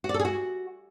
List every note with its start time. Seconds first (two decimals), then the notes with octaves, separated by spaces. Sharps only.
0.04 F#4
0.09 D5
0.14 A4
0.20 G#4
0.25 F#4